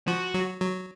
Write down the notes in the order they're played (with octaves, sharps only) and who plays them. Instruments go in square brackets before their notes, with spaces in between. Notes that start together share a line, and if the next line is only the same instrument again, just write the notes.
[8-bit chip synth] F3 [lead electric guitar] F#4
[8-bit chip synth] F#3
F#3